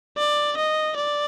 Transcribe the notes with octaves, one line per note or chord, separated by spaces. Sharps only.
D5
D#5
D5